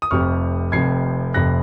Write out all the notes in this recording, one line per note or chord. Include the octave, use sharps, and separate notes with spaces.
D#6
F1 F2 C3 C#6 F6
F1 F2 C3 G#6 C7
F1 F2 C3 F#6 A#6